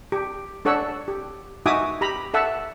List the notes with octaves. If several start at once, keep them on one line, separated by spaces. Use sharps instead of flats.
G4
D4 A4 C#5 F#5 E6
G4
D#4 F#4 E5 G#5 D6 D#6
G4 A#5 B5
A4 E5 F#5 A5 E6